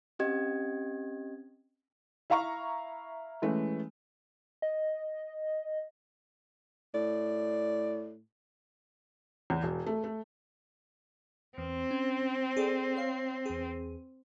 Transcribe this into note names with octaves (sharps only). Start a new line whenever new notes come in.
C4 C#4 G4 D#5 G#6
E4 E5 F5 A#5 C#6
E3 G#3 A3 C#4
D#5
A2 D5
E2
E1
A3
A3
E2 C4
C#4
G#4 A4 D5
C#5 F5 C6
E2 G#4